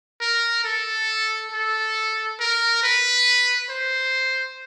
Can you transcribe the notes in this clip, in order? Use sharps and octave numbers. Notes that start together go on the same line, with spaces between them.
A#4
A4
A4
A#4
B4
C5